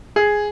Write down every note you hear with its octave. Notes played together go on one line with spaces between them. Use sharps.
G#4